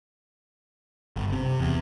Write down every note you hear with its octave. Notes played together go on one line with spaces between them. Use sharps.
G1
C3
E2